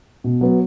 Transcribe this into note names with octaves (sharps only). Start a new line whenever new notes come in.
B2
F#3 B3